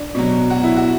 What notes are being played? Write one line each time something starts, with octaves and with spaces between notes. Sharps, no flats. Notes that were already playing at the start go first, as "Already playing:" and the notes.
Already playing: D4
B2 F#3
F#4
E4
F#4